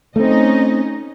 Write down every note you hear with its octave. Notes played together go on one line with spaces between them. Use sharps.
A3 C4 C#4 D#4 D#5